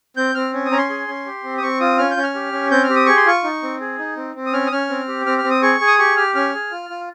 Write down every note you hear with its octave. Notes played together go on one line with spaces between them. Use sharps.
C4 G6
C4 F6
C#4
D#6
C#4 A#5
C6
G#4
C#4
G4
C4
D#6
C4 C#6
F4 D#6
C#4 F6
G6
C#4
F6
G4
C#4
C4 G6
F6
G4
D#6
G#4 C#6
C6
F4 C#6
D#4
C4
G#4
D#4
C4
C4
D#6
C#4 F6
D#6
C#4 F6
C4
G4
C4 F6
F6
C4
D#6
G#4 C#6
G#4
D#6
G4 C#6
G4 F6
C#4 F6
G#4
F4
F4